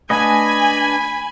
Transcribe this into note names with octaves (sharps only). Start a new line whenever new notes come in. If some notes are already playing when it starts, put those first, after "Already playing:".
A3 D4 B4 D#5 G#5 B5